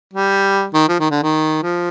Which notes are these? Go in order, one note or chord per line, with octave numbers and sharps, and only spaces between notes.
G3
D#3
F3
D#3
D3
D#3
F3